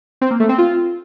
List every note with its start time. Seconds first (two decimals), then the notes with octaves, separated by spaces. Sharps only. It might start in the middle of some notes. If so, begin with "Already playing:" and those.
0.21 C4
0.31 A#3
0.40 A3
0.49 C4
0.58 F4